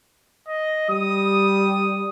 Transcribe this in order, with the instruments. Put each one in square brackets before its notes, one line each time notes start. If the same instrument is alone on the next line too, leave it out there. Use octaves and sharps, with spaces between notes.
[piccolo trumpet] D#5
[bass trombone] G3 [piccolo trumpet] D#6